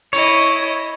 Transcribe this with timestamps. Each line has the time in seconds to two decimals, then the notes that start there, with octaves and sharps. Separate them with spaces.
0.13 E4 C#5 D#5